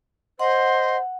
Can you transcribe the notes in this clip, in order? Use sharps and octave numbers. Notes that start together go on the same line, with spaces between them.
C5 D#5 F#5 C6